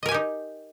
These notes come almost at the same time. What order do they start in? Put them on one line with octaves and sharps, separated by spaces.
D#5 A#4 G#5 G4 D#4